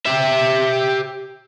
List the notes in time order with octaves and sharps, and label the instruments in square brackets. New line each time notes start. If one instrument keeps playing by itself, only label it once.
[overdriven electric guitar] G4 E5